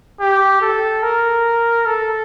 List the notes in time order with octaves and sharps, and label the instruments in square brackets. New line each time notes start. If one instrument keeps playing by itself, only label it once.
[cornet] G4
A4
A#4
A4